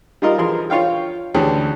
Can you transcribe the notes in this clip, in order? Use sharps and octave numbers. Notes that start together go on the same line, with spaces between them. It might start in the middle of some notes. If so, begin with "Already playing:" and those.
G3 D#4 F4 A#4 D#5
E3 F3 G#4 A#4 C6
F4 C#5 F5 G5
D2 D3 E3 C#4 G4 G#4